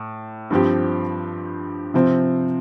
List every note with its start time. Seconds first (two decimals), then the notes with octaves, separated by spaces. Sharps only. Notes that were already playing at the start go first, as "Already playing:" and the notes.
Already playing: A2
0.50 G2 F3 C4 G4
1.94 C3 F3 C4